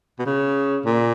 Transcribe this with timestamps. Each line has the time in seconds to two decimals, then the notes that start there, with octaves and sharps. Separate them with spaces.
0.19 B2
0.26 C#3
0.86 A#2